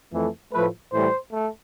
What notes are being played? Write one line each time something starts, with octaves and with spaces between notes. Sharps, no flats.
F2 E3 A3
A2 F3 A3 B4
A2 E3 G3 C5
A3